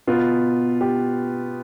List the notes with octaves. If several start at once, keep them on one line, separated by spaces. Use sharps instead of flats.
B2 B3 F4
G4